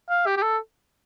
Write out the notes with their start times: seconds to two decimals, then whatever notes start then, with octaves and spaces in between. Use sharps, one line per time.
0.10 F5
0.26 G4
0.37 G4
0.43 A4